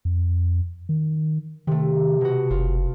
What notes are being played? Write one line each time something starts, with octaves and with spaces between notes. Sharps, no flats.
F2
D#3
C3 D#3 A3
B2 F#4
F#1 F4